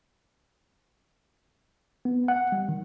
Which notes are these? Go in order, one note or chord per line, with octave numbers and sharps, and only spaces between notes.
B3
F#5
G3
D#3